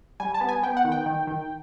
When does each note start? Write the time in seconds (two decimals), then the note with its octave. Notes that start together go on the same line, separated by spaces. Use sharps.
0.20 G3 G#5
0.34 A5
0.41 B3
0.49 G#5
0.63 B3 G5
0.77 F#5
0.85 D#3
0.92 G5
1.06 D#3
1.27 D#3